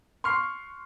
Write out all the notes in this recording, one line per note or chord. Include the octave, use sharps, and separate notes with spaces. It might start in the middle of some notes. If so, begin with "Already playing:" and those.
C6 C#6 F6 C7